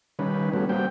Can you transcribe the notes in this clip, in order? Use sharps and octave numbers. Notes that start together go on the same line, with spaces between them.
D#3 G3 C#4 B4
G3 A3 B3 C#4 F#4
G3 A#3 C4 F#4 G5